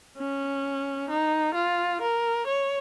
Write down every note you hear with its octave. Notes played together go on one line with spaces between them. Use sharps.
C#4
D#4
F4
A#4
C#5